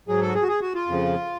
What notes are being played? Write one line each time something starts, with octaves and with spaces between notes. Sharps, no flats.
G#2 F#3 G#4
A4
F#4
G#4
F#4
G#4
F#4
F4
F2 C#3 F3